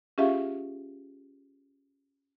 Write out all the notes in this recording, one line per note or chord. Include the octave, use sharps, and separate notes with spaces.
C#4 F4 G4 G#4 E5 F5